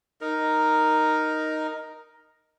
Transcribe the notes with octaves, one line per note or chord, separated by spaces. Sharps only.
D#4 A#4